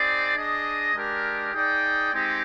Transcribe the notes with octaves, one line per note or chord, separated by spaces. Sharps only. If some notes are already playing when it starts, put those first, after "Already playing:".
Already playing: C4 D#4 G#4 D5
D4 G#4 D#5
G#3 D4 G4 A#4
D#4 G#4 D5 G5
G#3 C4 D#4 G4